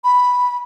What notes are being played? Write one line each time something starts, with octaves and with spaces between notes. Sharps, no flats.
B5